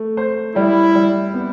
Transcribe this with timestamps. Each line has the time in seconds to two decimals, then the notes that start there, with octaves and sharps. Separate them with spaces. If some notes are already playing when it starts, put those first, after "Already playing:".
Already playing: A3
0.17 C5
0.56 G3 E4
0.95 G3
1.34 B3